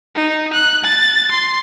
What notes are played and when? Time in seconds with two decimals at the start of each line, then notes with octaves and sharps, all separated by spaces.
0.15 D#4
0.53 F#6
0.84 A6
1.31 C6